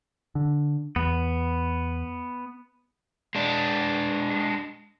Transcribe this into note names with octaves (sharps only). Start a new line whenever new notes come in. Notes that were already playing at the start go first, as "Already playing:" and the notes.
D3
E2 B3
G#3 D4